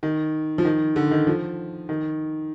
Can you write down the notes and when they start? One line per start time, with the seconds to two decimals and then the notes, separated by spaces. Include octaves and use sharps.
0.03 D#3
0.58 F3
0.65 D#3
0.96 D3
1.11 D#3
1.27 F3
1.89 D#3